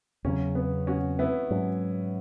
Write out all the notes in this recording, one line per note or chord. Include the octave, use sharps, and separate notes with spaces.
E2 C#3 F#3 C#4
B3
C#4 F#4
B3 E4
G#2 F#3 C#4